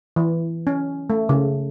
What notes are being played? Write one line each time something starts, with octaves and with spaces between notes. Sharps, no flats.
E3
C#4
A3
C#3